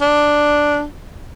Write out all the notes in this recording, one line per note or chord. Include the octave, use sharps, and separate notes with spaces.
D4